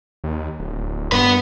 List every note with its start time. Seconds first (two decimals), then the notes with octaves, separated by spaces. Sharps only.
0.24 D#2
0.60 D1
1.12 G2 B3 B4